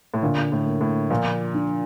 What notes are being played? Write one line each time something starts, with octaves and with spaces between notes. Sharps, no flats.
A2
A#2 D3
A2
A#3
A2
A#2 F3
D4